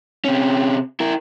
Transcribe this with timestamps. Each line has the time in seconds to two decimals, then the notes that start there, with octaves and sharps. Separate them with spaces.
0.25 C3 C#4
1.00 E4 A#4